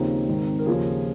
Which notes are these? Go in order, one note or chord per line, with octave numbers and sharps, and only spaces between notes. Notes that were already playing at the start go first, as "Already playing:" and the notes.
Already playing: D#2 C#3 F3 C4 D#4
G#1 G#2 D#3
A#4
D#2 C#3 F3 F4 G#4